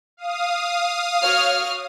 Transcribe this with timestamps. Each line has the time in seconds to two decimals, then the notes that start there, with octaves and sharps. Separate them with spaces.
0.17 F5 D#6
1.21 F#4 C#5 F6